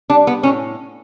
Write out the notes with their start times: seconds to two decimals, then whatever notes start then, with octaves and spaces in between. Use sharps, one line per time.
0.10 G3 D4
0.27 B3
0.43 A2 C#4